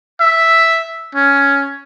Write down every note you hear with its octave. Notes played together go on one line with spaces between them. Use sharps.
E5
C#4